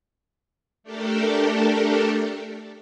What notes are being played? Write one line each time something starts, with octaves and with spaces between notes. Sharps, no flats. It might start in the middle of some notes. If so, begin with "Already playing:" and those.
A3 D4 G4 A4 A#4